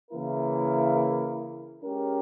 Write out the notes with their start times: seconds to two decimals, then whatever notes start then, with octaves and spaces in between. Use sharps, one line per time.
0.11 C#3 E3 A#3 E4 A#4
1.83 G#3 C#4 G4 A#4